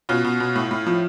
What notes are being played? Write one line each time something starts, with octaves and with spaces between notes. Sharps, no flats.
B2 C#4 F4
B2
B2
A2
A2
F3